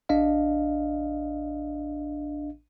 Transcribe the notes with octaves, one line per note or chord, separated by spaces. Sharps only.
A1 D4 D#5 F5